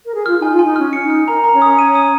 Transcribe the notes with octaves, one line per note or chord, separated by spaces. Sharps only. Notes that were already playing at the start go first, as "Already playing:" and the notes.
A#4
G#4
F4 F6
D#4
G#5
F4
D#4 G#5
C#4 F6
C#7
D#4
F6
A#4 A#5
A#5
C#4 C#5
D#6
D#7
D#6